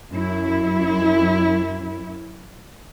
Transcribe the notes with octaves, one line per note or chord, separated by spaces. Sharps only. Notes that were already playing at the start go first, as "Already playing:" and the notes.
F#2 E4